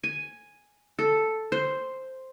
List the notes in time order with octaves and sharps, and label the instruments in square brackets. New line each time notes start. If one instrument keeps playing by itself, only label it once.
[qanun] G#5
A4
C5